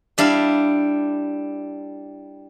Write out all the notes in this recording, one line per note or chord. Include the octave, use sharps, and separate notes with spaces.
G3 D4 E4 F5